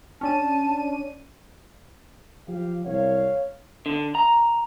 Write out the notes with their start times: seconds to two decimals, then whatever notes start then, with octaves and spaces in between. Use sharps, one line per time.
0.21 C#4 D4 A5 D#7
2.48 F3 G4 F5
2.85 C2 C#5 F5
3.86 D3
4.15 A#5